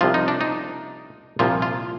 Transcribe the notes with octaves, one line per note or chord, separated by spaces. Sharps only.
C2 C3 F3 F4
D#4
D4
D#4
C2 A#2 F3 F4
F4